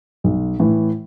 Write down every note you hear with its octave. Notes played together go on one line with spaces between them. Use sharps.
B1
A2 E3